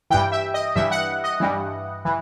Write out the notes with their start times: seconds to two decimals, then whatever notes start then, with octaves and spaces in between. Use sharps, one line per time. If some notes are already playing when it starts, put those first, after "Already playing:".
0.10 G2 E3 G5
0.32 E5
0.54 D#5
0.75 G2 E3 E5
0.91 F#5
1.24 D#5
1.40 G2 E3
2.05 E3